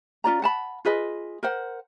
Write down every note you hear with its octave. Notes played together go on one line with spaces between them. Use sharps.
C#4 F4 D5 A#5
F#5 A5 B5
F4 G#4 B4 D#5
A#4 C5 F#5